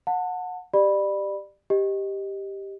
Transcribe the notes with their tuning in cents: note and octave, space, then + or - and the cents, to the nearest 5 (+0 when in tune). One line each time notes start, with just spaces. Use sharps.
F#5 -25 A5 +25
G4 +0 D5 +25 B5 -10
G4 +0 D#5 +0